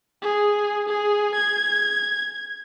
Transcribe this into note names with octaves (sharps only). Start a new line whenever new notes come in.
G#4
G#4
G#6